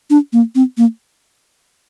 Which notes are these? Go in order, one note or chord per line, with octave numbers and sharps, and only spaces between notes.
D4
A#3
C4
A#3